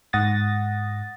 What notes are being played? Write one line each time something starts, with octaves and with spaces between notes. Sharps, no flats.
G#2 F#5 D#6 A6 A#6